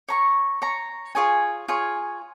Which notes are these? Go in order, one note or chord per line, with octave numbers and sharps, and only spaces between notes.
C#5 A#5 C#6
C#5 A#5 C#6
F4 G#4 C#5 G#5
F4 G#4 C#5 G#5